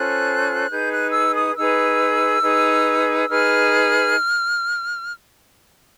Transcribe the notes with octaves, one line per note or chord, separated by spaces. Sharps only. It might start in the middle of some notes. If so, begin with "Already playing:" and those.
Already playing: C#4 F4 A4 C5 F#6
D#4 G#4 B4 G6
F#6
E6
D#6
D#4 G#4 B4 E6
D#4 G#4 B4
D#4 G#4 B4 F6